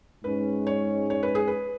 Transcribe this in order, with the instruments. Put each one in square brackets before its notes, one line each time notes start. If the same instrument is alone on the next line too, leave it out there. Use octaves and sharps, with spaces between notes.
[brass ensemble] G#2 G#3 C#4 [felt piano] B4
[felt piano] C#5
C#5
B4
G#4
B4